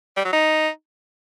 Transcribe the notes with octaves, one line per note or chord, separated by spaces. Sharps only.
G3
F#3
D#4